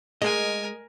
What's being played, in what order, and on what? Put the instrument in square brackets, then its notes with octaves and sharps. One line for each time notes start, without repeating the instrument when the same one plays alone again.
[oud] G#3 [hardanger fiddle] A#4 G#5 [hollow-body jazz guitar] D#5